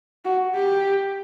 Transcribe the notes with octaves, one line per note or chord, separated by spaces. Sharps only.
F#4
G4